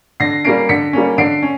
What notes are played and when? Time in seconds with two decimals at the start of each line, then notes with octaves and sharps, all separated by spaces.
0.20 D3 A#6 C7
0.45 G3 A#3 C#4 C7 D7
0.69 D3 B6 C#7
0.93 G3 A#3 C#4
1.18 D3 C7 D7
1.43 C#4